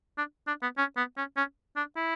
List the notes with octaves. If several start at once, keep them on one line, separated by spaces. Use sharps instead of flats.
D4
D4
B3
C#4
B3
C#4
C#4
D4
E4